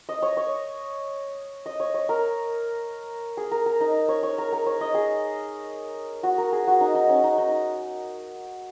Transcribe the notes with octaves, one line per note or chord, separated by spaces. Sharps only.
D#5
C#5
C#5
D#5
C#5
C#5
A#4
G#4
A#4
A#4
D#4
C#5
C#5
A#4
A#4
C#5
D#5
G#4
F#4
A#4
G#4
F#4
D#4
D#4
C#4
D#4
D#4